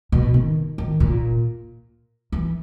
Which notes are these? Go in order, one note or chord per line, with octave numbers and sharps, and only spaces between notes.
B2
D#3
D#3
A#2
E3